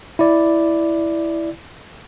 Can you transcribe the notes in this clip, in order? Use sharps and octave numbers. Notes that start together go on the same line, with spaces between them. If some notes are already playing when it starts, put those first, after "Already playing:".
E4 D5